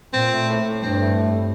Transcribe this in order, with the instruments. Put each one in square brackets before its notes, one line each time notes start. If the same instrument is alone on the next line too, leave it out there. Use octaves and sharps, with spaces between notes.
[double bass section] A#2 [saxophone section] C4
[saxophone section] A3
A2
A2
[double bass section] G2 [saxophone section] C4
[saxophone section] A3
A2
A2